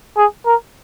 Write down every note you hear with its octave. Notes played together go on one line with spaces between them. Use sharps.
G#4
A#4